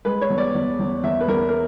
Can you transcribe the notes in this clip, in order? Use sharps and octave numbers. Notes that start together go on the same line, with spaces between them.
G#3 B4
C#5
E2
D5
E2
E2
E2 E5
B4
E2 A#4
A#4